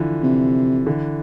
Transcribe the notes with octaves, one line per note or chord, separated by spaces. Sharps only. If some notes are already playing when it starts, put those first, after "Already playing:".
Already playing: D3 E3 F3
C3
D3 E3